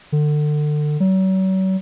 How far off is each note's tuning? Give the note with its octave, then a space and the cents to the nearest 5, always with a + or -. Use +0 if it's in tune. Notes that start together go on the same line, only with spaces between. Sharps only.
D3 +30
F#3 +40